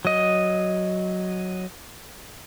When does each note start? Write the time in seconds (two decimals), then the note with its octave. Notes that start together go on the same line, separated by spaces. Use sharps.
0.05 F#3 D#5